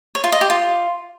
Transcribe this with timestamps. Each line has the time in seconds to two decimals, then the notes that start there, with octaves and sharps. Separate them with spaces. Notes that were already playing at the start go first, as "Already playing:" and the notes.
0.15 C#5
0.24 F4
0.32 D#5
0.41 G4
0.50 F4